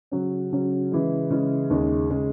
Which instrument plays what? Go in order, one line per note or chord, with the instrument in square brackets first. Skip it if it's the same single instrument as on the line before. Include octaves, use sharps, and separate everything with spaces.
[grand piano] C#3 F#3 C#4
C#3 F#3 C#4
C#3 E3 G#3
C#3 E3 G#3
D#2 C#3 G#3
C#3 G#3